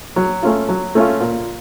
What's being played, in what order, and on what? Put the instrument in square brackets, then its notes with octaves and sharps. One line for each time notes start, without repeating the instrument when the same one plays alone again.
[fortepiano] F#3
A3 C#4 F4
F#3
A3 C#4 F4
A#2